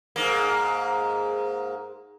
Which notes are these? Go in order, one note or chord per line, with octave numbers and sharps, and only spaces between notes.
G#2 A#3